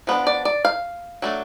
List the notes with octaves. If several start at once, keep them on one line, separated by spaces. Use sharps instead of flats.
F3 B3 D4
D5
D5
F5
F#3 A3 D4